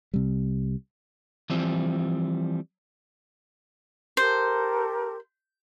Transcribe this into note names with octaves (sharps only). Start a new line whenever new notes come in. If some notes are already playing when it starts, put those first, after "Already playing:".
C2 C3 G3
E3 F3 G3 C4
G4 A4 A#4 C5